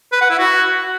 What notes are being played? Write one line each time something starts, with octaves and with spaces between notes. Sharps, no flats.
B4
F#5
E4
F#4